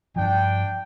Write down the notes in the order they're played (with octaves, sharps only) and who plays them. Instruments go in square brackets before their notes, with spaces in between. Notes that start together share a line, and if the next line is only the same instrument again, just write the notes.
[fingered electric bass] G2 F3 [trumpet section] D4 G5